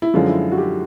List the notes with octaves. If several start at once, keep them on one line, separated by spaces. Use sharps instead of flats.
E4
F#2 D3 F3 G#3 F4
E4
F#4
G4